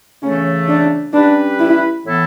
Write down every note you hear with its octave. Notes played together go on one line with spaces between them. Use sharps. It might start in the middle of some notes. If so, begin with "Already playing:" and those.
C#3 E3 A3 C#4
D4
G3 C#4 D4 G4 B4
E4
A2 E3 B3 E4 A4